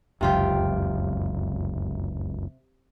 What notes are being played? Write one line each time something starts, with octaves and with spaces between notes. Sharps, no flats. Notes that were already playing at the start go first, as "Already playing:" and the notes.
F1 C#2 F#2 C3 F4 G4